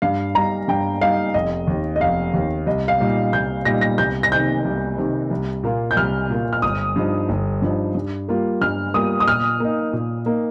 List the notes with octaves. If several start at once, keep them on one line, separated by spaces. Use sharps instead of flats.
G2 F5
G3 D#4 A#5
G2 G5
G3 D#4 F5
F1 D#5
D#2 D#3
D#5
F1 F5
D#2 D#3
C2 D#5
F5
A#2 G3 D#4
C2 G6
A#2 G3 D#4 A#6
A#6
C2 G6
A#6
C3 D#3 G6
C2
C3 D#3
C2
A#2 A#3 F4
G6
C2 F6
A#2 A#3 F4
F6
G1 D#6
G2 F3 D#4
G1
G2 F3 D#4
G2
G3 A#3 F4
G2 F6
G3 A#3 F4 D#6
D#6
A#2 F6
A#3 D#4
A#2
A#3 D#4